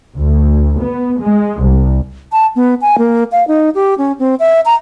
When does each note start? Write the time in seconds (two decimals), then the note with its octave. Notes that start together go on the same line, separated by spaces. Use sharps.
0.16 D2
0.80 B3
1.20 G#3
1.60 C2
2.32 A5
2.56 B3
2.81 G#5
2.98 A#3
3.32 F5
3.48 D#4
3.75 G4
3.98 C#4
4.19 C4
4.40 E5
4.65 A#5